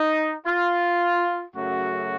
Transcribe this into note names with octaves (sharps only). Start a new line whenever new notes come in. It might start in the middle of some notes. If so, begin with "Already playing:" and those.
Already playing: D#4
F4
F#2 C#3 F#3 A3 F#4